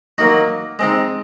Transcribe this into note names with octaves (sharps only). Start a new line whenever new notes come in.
F#3 A#3 D#4 F#4
G#3 C4 D#4